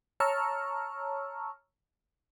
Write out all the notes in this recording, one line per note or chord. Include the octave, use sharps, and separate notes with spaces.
C#5 A5 A#5 C#6 E6 F6